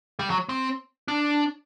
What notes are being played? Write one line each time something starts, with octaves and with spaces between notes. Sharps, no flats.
G3
F#3
C4
D4